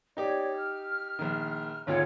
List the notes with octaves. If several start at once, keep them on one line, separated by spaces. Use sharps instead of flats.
D#4 G4 C#5 D5 D6
F6
A#1 D#3
G#1 D2 F4 C#5 F#5